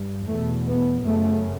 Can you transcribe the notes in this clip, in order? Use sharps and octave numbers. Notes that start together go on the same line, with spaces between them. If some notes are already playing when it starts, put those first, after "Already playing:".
Already playing: G2
E2 B2 A3
B3
F#2 C#3 A3